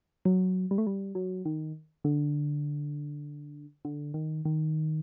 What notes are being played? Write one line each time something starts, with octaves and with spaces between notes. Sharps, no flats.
F#3
G3
A3
G3
F#3
D#3
D3
D3
D#3
D#3